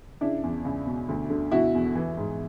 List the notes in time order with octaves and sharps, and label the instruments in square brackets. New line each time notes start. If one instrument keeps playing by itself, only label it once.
[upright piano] C#3 D4 E4
E2
C#2
B2
D2
D3
B2 E4 F#4
E2
E3
G#2